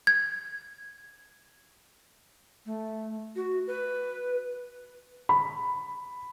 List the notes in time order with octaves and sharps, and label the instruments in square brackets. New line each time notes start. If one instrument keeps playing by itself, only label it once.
[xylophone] G#6
[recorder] A3
F#4
B4
[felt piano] B5